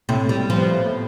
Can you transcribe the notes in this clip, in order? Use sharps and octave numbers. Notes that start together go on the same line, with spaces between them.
A2 C3
A2 G3
G3
F3
B3
A2
A2